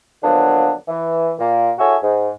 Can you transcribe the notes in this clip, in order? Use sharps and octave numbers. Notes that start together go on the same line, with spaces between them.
D3 F3 F#3 A#3 B3 D4
E3
A#2 A#3
E4 F#4 G#4 A4 C#5 E5
G#2